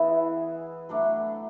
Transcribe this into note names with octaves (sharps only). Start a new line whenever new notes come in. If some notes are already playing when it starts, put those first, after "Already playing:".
Already playing: E3 B3 E4 G#4
F#3 A3 D4